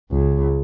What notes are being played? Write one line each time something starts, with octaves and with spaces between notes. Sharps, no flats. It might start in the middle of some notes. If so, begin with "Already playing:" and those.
C#2